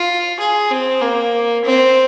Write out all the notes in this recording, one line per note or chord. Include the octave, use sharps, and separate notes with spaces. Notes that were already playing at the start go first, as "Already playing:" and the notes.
Already playing: F4
G#4
C4
A#3
C4